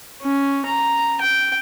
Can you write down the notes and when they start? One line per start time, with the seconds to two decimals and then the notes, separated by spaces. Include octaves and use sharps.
0.22 C#4
0.66 A#5
1.21 G5